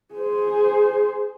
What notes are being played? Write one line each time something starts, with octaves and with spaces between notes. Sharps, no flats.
G#4 C5